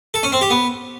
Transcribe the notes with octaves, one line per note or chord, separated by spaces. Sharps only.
A4
C#4
C4
G4
B3